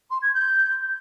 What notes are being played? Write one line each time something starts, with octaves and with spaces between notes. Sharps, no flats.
C6
G#6
G6